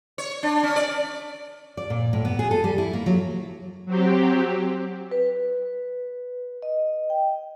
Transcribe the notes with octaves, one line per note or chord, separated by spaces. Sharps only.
C#5
D4
C#4
D5
D5
A#2
A2
B3
G#4
A4
G3
E4
A#3
F#3
F#3 C4 G4
B4
D#5
G5